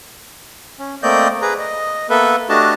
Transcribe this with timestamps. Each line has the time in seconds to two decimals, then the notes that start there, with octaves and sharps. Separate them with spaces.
0.79 C#4
1.03 A3 A#3 C4 D5 D#5 G6
1.42 G#4 B4 A#5
1.59 D#5
2.10 A#3 B3 A4 B4 E5
2.49 A3 D4 F#4 G4 D#5 A5